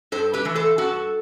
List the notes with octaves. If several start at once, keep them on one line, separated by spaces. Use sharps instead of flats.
G2 A4 C5
G4 B4
E3 A3
A4 C5
G2 F#4 A4